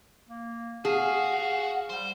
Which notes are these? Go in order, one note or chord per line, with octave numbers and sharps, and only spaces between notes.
A#3
F#4 G#4 F5
G3 C5